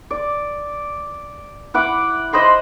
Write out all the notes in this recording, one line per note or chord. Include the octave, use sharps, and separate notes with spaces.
D5
E4 F#5 B5 D6
C5 D#5 B5 C6